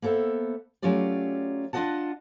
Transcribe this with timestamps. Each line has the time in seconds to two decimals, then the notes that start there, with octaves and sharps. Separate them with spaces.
0.02 A#3 B3 A4 C5 E5
0.82 F#3 A3 C#4 F4 G4 D5
1.73 D4 F4 G4 D#5 F#5 A5